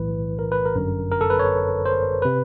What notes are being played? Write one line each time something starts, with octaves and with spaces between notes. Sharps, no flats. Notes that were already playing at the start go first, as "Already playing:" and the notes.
Already playing: B1 A2 E3 B4
A#4
B4
A#4
G1 F#2 D3
A#4
A4
B4
C#5
C5
C3 B4